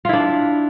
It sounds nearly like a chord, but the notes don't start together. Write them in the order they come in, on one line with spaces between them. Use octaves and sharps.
F4 E4 D4